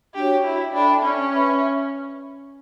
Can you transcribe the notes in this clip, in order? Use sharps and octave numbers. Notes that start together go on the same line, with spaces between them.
D4 F#4 G4 C#5
E4
D4 A4 E5 G5 B5
C#4
B4 E5 B5